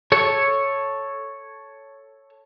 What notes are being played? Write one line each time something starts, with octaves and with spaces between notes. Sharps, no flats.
A4 C#5